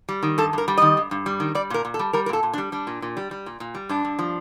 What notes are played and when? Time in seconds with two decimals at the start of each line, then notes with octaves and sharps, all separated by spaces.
0.09 G3
0.23 D#3
0.38 G2 A4
0.53 G2 A#4
0.68 G3
0.78 D#3 D#5
0.97 G2
1.11 G2
1.26 G3
1.40 D#3
1.55 G3 D5
1.70 A#2 A#4
1.85 A#2
1.94 A4
1.99 G3
2.13 G3 A#4
2.26 A#4
2.29 A#2 A4
2.43 A#2
2.54 D4
2.58 G3
2.72 G3 D4
2.87 A#2
3.02 A#2
3.17 G3
3.31 G3
3.46 A#2
3.60 A#2
3.75 G3
3.89 G2 D4
4.05 G2
4.19 F3